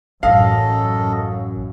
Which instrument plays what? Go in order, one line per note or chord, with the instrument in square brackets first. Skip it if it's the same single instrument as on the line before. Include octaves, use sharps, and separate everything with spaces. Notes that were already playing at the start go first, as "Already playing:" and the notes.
[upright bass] A1 [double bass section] F#2 [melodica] A4 D#5 [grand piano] F5